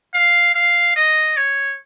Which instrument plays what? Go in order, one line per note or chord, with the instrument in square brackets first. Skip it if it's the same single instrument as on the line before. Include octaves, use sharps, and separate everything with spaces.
[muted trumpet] F5
F5
D#5
C#5